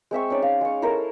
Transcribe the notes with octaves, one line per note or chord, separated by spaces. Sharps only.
G#3 C4 E5 C#6
C#4 D#4 D5
F5
G#3 C#6
E4 A4 A#4 C5